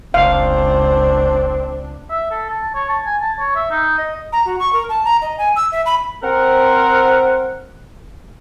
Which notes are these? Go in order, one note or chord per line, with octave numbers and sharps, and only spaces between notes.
F1 C#2 C4 D4 F5
E5
A4
A5
C#5
A5
G#5
A5
C#5
E5
D#4
D#5
A#5
F#4
C#6
A#4
A5
A#5
D#5
G#5
E6
E5
B5
C4 A#4 F#5